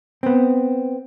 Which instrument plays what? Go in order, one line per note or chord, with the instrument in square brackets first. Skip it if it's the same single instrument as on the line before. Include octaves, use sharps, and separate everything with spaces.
[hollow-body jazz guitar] B3 C4